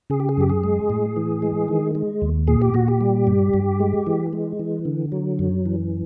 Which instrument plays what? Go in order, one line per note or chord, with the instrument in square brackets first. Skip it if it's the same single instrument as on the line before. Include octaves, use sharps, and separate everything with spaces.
[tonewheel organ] C#3 G#4
G4
G#4
F#2 G4
G#4
G#3
A2
E3
G#3
D#3
G#3
D#2
A#2 G#4
G4
A#2 F#4
G4
G3
G2
G2
G#3
E3
G#3
E3
D3
F#3
F#2
E3